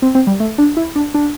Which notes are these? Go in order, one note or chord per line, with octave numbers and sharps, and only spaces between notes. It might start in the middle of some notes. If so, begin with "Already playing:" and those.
C4
C4
G3
A3
D4
E4
D4
D4